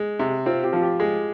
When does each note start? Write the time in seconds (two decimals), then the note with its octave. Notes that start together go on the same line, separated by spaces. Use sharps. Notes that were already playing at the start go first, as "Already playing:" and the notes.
Already playing: G#3
0.19 C3
0.46 C4 F4
0.63 G4
0.73 F3 F4
0.82 G4
0.99 G#3 G#4